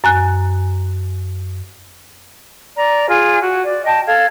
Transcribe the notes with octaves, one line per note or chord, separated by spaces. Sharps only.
F#2 G#5 F#6
D5 A#5
F4 G#4
F#4
D5
D#5 G5 A5
A4 F5 G#6